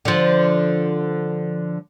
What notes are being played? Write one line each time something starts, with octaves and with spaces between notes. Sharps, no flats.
D3 F3